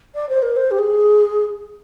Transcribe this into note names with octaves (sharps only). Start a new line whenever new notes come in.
D5
C5
A#4
C5
G4
G#4